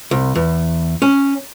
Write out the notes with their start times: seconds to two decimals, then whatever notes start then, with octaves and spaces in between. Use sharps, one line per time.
0.11 C2
0.35 E2
1.02 C#4